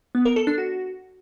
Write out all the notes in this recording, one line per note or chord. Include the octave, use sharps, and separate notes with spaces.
B3
A#4
A4
D4
F#4